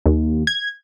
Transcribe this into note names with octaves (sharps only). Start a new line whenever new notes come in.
D#2
G#6